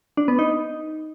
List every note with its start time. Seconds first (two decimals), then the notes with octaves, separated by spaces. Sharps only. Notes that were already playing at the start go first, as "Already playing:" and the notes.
0.17 D4
0.28 B3
0.39 D#4